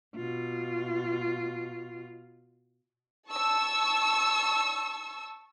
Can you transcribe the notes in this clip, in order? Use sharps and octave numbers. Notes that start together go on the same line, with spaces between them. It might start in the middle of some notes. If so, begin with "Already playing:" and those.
B2 F4
A5 C#6 E6